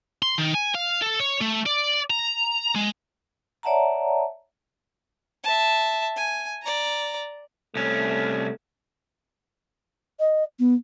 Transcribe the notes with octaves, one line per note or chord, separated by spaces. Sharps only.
C6
D#3
G#5
F5
A4
C#5
A3
D5
A#5
G#3
C#5 D5 E5 F#5 A5 A#5
E5 A5
G#5
D5 A#5
C2 A3 C#4
D#5
B3